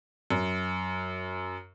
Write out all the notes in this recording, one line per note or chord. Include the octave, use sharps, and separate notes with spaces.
F#2